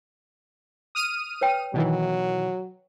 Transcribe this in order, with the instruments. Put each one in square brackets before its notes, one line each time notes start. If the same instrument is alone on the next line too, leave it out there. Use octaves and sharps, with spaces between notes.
[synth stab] D#6 F6 D#7
[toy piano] B4 C#5 G5
[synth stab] B2 D#3 E3 [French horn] F#3